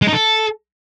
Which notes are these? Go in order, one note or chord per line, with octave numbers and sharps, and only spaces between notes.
G#3
D#4
A4